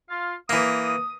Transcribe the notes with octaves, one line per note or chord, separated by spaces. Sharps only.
F4 F5
E3 A#3 D#6